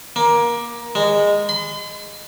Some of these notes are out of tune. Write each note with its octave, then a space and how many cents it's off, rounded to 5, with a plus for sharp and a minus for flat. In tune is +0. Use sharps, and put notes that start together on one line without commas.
A#3 +20
G#3 -15
C6 -45